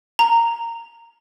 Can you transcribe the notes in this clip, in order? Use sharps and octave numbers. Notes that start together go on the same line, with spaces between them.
A#5